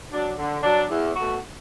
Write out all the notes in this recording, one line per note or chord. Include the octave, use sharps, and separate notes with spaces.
F#3 D4
D3
F#3 D4
E2
B2 A3 F#4